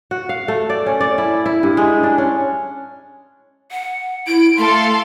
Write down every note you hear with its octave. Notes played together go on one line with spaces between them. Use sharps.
F#4
F5
A3
D5
C#4
D5
E4
E4
G2
G#3
D4
C#4
F#5
E4 D7
A3 A4 F5 C6